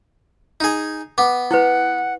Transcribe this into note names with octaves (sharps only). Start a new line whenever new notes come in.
D#4 G#4
B3 D6
E4 B4 F#5